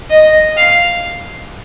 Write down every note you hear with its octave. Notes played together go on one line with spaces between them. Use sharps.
D#5
F5